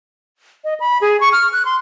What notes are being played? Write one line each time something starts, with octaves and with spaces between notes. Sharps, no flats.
D#5
B5
G#4
C#6
F6
F#6
C6